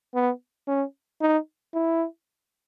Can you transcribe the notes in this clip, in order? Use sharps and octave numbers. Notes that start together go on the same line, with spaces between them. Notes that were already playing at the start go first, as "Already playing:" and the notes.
B3
C#4
D#4
E4